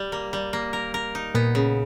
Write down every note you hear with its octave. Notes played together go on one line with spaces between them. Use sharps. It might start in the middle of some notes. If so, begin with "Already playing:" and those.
Already playing: G3
A#3
G3
A#3
A#4
A#4
D#4
A#2 B3
C#3